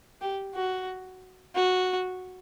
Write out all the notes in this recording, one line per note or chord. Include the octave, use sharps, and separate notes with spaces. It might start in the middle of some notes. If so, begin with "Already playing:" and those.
G4
F#4
F#4